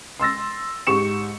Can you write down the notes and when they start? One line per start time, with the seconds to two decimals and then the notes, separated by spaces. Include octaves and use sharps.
0.20 C6 E6 A6 A#6
0.87 G#2 G4 C#6 C#7 E7